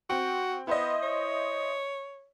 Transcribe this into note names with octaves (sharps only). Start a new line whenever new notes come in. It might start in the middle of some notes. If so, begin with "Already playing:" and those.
C4 F#4 G5
B3 E4 C5 D#5
C#5